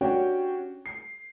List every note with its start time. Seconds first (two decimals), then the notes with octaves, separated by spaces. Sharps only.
0.01 C#4 D4 F#4 G4 C#5 G5
0.86 C7